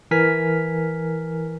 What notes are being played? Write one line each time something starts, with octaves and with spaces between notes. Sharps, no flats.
E3 A#4 G#5 F6 B6